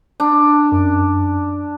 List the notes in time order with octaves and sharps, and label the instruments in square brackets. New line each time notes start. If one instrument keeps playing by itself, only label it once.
[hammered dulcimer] D4
[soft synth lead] F#2